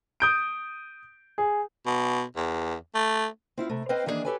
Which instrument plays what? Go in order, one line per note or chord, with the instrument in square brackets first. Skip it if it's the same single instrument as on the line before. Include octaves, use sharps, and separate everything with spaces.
[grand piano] D#6 G6 D7
G#4
[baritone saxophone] B2
E2
A3
[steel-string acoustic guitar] C4 E4 F4
C3 A3
C4 B4 C5 D#5 F5 G5
D#3 E3 A#3 B3 D4 G#4
G4 A4 B4 C#5 G#5